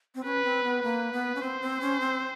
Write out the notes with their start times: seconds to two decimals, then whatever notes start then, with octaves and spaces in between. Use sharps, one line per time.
0.15 C4
0.24 C#4 B4
0.44 C4
0.64 B3
0.83 A#3 B4
1.13 B3
1.35 C#4
1.41 C4 C5
1.61 C4
1.81 C#4
2.00 C4